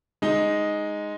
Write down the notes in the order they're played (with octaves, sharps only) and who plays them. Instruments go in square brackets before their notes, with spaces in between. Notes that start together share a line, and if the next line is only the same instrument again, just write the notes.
[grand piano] G#3 D#4